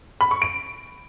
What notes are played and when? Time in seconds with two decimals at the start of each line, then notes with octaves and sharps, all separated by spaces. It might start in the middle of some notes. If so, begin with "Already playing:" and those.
0.21 B5
0.31 C#6
0.42 D7